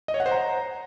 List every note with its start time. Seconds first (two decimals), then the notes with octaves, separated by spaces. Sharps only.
0.08 D#5
0.14 C#5
0.20 F#5
0.26 C5
0.32 A#5